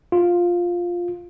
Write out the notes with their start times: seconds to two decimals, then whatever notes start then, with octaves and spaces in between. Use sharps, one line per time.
0.12 F4